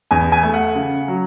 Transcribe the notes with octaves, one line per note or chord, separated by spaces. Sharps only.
E2 G#5
G#5
A3
F#5
C#3
F#3